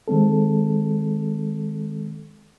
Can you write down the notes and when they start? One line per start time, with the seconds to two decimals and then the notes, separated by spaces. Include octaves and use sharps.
0.08 D#3 G#3 C4 A4